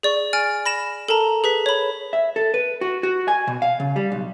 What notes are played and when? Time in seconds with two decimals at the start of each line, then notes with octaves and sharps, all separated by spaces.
0.03 G#4 D5 C#6
0.33 G#5 F6 A6 D7
0.66 B5 A#6 E7
1.09 A4 A#4 A5 A#5
1.44 G#4 B4 B6
1.66 C#5 B5
2.13 E5
2.36 A4
2.54 B4
2.81 F#4
3.03 F#4
3.28 G#5
3.47 B2
3.62 F5
3.80 C#3
3.96 G3
4.12 B1